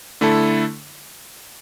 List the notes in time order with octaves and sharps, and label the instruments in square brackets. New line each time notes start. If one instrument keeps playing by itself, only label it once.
[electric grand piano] D3 A3 E4 A4